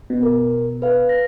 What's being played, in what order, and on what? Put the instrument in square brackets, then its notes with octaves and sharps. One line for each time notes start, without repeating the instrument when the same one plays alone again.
[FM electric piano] B2
[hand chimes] A#4
B4 F5
A#6